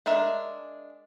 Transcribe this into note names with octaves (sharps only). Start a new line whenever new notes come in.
G#3 D4 A#4 E5